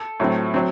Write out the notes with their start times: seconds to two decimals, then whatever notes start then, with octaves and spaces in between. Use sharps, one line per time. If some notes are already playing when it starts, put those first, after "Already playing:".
Already playing: A4
0.20 A2 F#3 A3 C4
0.54 F#3 C4